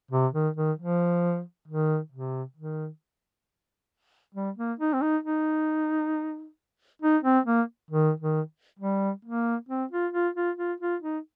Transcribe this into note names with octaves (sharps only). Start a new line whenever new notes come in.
C3
D#3
D#3
F3
D#3
C3
D#3
G3
A#3
D#4
C4
D#4
D#4
D#4
C4
A#3
D#3
D#3
G3
A#3
C4
F4
F4
F4
F4
F4
D#4